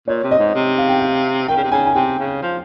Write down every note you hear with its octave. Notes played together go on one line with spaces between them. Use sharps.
A#2 C#5
C3
D#5
G#2
C3
F5
G5
F5
D#3 G5
C#3
C3
C#3 G#5
G#5
C3 G5
C#3
F3